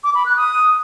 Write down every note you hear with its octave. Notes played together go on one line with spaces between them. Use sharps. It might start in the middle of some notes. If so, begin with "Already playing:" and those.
D6
B5
F#6
D#6